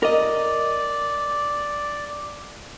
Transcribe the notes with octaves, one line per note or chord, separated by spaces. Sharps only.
A#4 D5 D#5